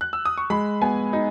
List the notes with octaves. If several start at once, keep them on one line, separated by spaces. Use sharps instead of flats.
F#6
E6
D#6
C#6
G#3 B5
B3 G#5
D#4